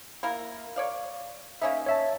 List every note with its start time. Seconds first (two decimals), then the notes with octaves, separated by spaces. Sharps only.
0.23 A#3 E4 A#4
0.76 C#5 D5 F5
1.62 A#3 C#4 D#4 E5
1.86 C#5 E5 A5